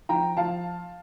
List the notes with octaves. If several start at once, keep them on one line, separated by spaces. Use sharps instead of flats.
F3 G5 A#5
F3 F5 A5